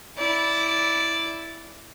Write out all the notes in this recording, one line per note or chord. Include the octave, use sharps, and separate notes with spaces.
E4 D5